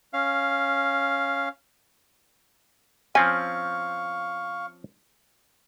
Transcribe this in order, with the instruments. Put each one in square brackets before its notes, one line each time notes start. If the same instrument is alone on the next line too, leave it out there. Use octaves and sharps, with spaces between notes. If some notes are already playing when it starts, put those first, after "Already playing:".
[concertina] C#4 F5
[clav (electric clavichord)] F3 C4 C#4 [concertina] F5 C#6 [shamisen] G#5